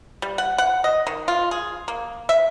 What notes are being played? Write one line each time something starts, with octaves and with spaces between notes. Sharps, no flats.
G3
F#5
F#5
D#5
D#3
F4
G#4
A#3
E5